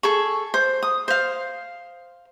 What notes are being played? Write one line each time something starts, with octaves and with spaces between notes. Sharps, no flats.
G#4 A4 C#6
C5
D#6
C5 F5